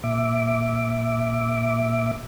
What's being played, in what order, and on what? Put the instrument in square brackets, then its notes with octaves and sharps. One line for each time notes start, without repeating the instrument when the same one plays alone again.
[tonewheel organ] A#2 E5 D6